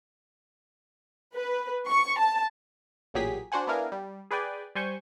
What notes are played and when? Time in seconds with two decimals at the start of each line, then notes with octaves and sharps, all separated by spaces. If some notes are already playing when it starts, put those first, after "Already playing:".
1.35 B4
1.89 C#6
2.19 A5
3.14 A1 A#2 F#3 G4 G#4 B6
3.52 D4 F#4 C5 F#5 G#5
3.67 B3 D4 E4 A#4 F5 G#5
3.92 G3
4.31 G#4 B4 D5 G5 G#5
4.75 G3 C5 G#5 C#6 G6